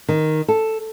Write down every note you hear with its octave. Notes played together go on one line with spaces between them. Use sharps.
D#3
A4